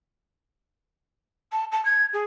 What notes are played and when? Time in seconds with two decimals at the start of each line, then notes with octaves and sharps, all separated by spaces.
1.52 A5
1.72 A5
1.85 G#6
2.13 G#4